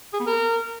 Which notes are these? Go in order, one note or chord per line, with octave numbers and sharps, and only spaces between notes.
G#4
B3
A#4